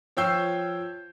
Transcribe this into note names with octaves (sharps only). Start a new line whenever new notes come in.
F3 C#5 G5 E6 G6 C7